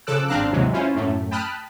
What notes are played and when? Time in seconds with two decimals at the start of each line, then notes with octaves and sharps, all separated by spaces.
0.07 C#3 F3 A4 D6 E6 F#6
0.28 G#1 C4 D4 F5 A#5 F#6
0.52 D#2 G#2 C3 E3 F#3 G#3
0.73 C#4 E4 F4 C5
0.95 F#2 A2 A3
1.31 G5 A5 B5 D#6 F6 F#6